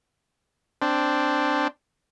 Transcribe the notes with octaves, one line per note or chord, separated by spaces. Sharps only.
C4 D4